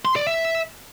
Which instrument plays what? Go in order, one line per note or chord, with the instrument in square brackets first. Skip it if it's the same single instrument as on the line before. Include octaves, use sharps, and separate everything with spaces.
[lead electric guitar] C6
D5
E5